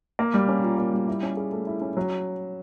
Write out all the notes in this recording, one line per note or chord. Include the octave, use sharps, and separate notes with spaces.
A#3
G3
C#4
A#2
A#3
G3
E4
C#4
G#4
A3
E4
C#4
F#3